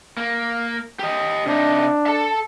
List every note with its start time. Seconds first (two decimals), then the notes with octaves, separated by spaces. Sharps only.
0.17 A#3
0.99 G4 D#5
1.46 C3 D4 D#4
2.07 A4 A5